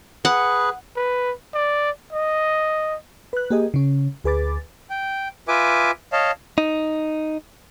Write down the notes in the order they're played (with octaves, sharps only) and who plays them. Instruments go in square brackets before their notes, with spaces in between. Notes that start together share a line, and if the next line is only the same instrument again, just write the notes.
[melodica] G#4 B4 [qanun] F#5
[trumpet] B4
D5
D#5
[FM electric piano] B4 F#6
A#3 G4 G#4 D#5
C#3 C#4
D2 G#4 B4 D6 A6
[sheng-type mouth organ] G5
F4 B4 E5 G#5 D6
C#5 D#5 F5 A5
[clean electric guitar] D#4